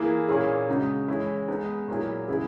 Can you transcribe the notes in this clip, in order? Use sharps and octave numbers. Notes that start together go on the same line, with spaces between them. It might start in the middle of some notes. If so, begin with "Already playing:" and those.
Already playing: E3 A#3 E4 G#4
A#2 A#3 C#4 E4 G#4
C#3 G#3 D#4 F#4
E3 G#3 C#4 E4
G#3 B3 D#4
A#2 F#3 A#3 E4 G#4
C#3 G#3 B3 E4 G#4